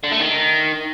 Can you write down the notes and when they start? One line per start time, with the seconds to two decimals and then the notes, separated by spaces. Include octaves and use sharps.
0.04 D3
0.12 A3
0.20 D#3